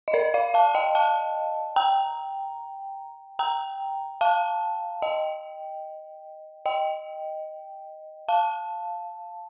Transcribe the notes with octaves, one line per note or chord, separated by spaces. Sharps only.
D#5
A#4 D5
D5 F5
F5 A5
D#5 G5
F5 A5
G5 A#5
G5 A#5
F5 A5
D#5 G5
D#5 G5
F5 A5